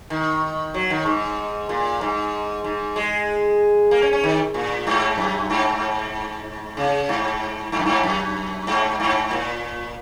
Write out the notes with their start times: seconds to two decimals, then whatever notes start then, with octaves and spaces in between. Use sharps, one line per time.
0.10 D#3
0.74 F#3
0.90 D#3
1.06 G#2
1.69 A#2
2.01 G#2
2.64 G#2
2.96 G#3
3.91 A#3
4.02 C#4
4.13 C#4
4.24 D#3
4.54 A#2
4.87 G#2
5.18 F#2
5.50 G#2
6.77 C#3
7.09 G#2
7.72 G#2
7.79 F#2
7.86 G#2
8.03 F#2
8.67 G#2
9.00 G#2
9.31 A#2